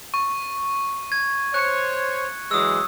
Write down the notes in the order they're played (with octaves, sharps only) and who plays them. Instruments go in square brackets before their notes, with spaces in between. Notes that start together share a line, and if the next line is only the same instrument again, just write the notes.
[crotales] C#6
[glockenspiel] G#6
[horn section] C5 C#5 [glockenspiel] F#6 C#7
[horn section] E3 F#3 G#3 [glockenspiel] D#6 E6